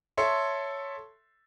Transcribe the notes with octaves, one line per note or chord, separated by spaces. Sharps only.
A4 C#5 E5 C6